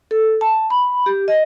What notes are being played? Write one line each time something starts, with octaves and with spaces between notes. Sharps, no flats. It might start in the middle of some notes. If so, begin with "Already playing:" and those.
A4
A5
B5
G4
D#5